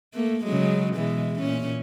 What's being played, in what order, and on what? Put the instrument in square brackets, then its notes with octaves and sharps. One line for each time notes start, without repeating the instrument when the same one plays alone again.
[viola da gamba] A3 A#3
C#3 F#3 G#3
B2 E3 G#3
A#2 C#4